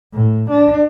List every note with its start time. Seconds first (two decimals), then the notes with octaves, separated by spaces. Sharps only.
0.14 A2
0.50 D4